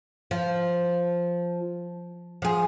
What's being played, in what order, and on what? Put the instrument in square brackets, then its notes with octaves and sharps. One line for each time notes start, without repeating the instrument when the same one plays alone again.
[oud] F3
F3 G#4